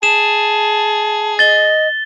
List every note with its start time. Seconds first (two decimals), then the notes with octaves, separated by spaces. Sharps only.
0.03 G#4 A5 E7
1.39 D#5 A6 G7